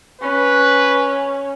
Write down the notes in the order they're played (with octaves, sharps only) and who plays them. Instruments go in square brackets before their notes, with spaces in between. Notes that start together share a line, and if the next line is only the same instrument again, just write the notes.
[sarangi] C#4 [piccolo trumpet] B4